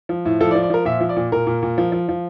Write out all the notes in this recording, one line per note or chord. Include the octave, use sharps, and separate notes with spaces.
F3
A2
F3 A4
D5
F3
D5
F3 A#4
A#2 E5
F3
D5
A#2
A#2 A#4
A#2
A#2
F3
F3
F3